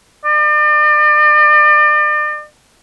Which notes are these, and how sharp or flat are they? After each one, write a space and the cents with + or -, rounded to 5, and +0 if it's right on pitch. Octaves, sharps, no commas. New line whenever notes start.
D5 +40